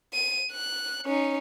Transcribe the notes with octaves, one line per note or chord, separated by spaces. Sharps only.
D#7
F#6
C#4 D#4